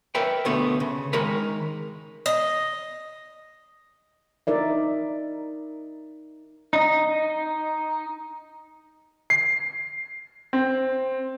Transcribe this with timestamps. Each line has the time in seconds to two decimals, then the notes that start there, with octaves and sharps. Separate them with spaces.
0.15 A#4 B4 C#5 E5 G5
0.45 D2 B2 A3 B3
0.80 C#3
1.13 D#3 G#3 A#4 B5
2.26 D#5
4.47 D#4 A#4 D5 E5
6.73 D#4
9.30 C7
10.53 C4